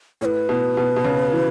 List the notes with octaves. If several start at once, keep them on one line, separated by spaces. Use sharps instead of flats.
A2 B4 C#5
B2
B2
B2
C#3
E3